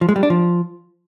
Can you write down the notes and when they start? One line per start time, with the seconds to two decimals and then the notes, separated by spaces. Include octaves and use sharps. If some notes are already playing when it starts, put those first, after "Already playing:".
0.01 F3
0.09 G#3
0.16 G3
0.23 D4
0.30 F3